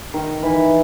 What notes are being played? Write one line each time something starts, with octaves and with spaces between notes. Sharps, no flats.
D#3
E3